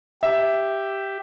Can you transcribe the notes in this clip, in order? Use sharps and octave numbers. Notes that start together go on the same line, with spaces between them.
G4 E5